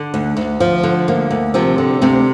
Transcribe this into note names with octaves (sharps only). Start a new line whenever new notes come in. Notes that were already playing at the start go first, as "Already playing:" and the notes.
Already playing: D3
D2
D2
F3
D3
D2 A#3
D2
C3 F3 C4
D3
D2 C3 C4